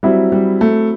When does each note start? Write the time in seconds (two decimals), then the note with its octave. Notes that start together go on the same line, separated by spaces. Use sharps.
0.03 F#3 G3 C4 E4
0.32 G3
0.61 A3